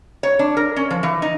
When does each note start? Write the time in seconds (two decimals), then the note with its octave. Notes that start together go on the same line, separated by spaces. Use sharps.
0.23 C#5
0.39 D4
0.57 A#4
0.76 C#4
0.91 F3
1.03 E3
1.22 D#4